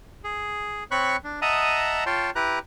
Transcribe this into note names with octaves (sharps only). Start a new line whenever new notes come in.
G#4
C4 C#5 B5 C#6 F#6
D4
D#5 E5 F#5 A5 A#5 D#6
F4 C#5 G5 A5 C6
E4 G4 B4 A#5 F#6